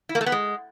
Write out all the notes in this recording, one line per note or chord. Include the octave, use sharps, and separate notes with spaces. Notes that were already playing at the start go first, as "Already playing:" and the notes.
E4
A#3
A3
B3
G#3